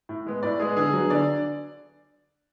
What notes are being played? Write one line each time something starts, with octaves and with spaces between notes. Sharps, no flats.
A2
G#3 B3
A2 D5
G#3 B3 G#4
D3 G#4
F#3 B3
D3 D5